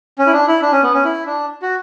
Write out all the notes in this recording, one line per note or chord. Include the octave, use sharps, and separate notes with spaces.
C#4
E4
D4
E4
D4
C#4
B3
C#4
E4
D4
F#4